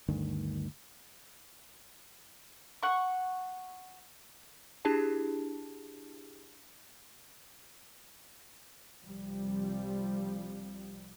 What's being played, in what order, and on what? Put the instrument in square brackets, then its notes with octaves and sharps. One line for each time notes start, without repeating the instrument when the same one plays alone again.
[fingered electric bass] G1 D2 G2 D#3
[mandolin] F#5 C#6
[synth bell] D4 E4 G4 G#4 A5
[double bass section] C2 F3 G3